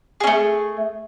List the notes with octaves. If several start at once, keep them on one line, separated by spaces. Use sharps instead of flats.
A3 C#4 G#4